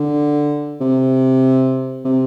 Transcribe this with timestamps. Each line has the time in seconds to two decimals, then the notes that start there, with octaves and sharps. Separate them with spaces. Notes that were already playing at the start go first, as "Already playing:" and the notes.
Already playing: D3
0.81 C3
2.04 C3